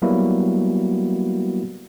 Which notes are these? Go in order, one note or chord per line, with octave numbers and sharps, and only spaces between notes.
F#3 G3 A#3 B3 E4 F#4